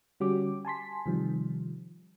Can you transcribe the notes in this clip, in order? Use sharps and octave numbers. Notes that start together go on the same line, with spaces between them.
D3 G3 C#4 F#4 G4 D6
G#5 A5 C6 B6
C3 D#3 F3 G3